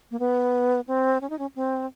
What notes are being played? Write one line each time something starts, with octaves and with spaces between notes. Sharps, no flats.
A#3
B3
C4
C#4
D#4
C#4
C4